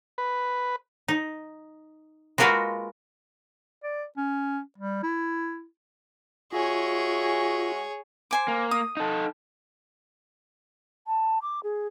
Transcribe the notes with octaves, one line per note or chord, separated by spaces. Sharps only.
B4
D#4
G#3 A#3 F4 F#4 A#4 B4
D5
C#4
G3
E4
G#3 F4 F#4 G#4 C#5 E5
C5 G#5 D6
A#3
D#6
D#4 A4
A5
D6
G#4